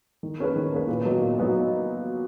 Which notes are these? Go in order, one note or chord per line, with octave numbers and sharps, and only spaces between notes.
D#3
A#3 C#4 G#4 B4
D#3
A#3 C#4 G#4 B4
A#2
F#3 B3 D#4
A#2
F#3 B3 D#4